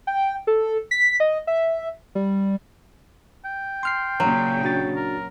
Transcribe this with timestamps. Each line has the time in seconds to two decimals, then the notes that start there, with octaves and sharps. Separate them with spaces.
0.07 G5
0.47 A4
0.91 B6
1.20 D#5
1.47 E5
2.15 G3
3.45 G5
3.83 C6 F6 C7
4.20 A#2 C#3 F#3
4.63 D4 F#4 A6
4.96 A#4